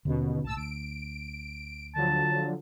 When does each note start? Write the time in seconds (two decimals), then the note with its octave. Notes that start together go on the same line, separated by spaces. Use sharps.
0.05 D#2 B2 D3 B3 C#4
0.44 C2 A2 A5 E6
0.57 D2 D7
1.95 D3 F3 F#3 A5